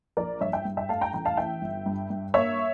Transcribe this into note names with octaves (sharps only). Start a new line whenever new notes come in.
A#1 A#4 D5
G2 C#5 E5
E5 G5
G2
E5 G5
A3 F5 A5
G5 A#5
A1 G5 A#5
F5 A5
E3 E5 G5
G1
G2
G2
A#3 C#5 E5